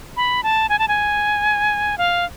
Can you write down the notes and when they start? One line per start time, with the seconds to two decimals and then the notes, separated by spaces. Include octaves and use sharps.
0.17 B5
0.43 A5
0.69 G#5
0.79 A5
0.88 G#5
1.98 F5